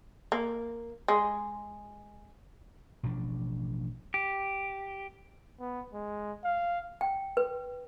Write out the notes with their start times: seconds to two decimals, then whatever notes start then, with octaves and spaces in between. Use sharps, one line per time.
0.32 A#3
1.08 G#3
3.03 A1 B2 F3 D4
4.14 G4
5.60 B3
5.94 G#3
6.44 F5
7.01 G5
7.37 B4